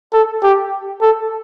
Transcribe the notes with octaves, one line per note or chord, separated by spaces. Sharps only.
A4
G4
A4